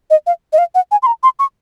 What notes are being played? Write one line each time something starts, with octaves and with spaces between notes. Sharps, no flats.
D#5
F5
D#5
F5
F#5
G#5
C6
A#5
C6
C#6